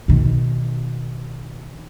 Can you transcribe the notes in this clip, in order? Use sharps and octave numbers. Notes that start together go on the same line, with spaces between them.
B2 D#3